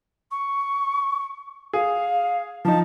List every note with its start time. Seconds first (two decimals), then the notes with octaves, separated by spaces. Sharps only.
0.31 C#6
1.73 G#4 F5
2.65 F3 D#4 A5